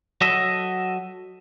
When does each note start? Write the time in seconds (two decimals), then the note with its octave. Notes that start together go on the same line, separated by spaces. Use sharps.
0.21 F#3 F#4 A4 D#5 E5